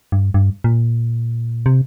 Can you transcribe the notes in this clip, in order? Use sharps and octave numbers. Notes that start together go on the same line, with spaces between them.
G2
G2
A#2
C3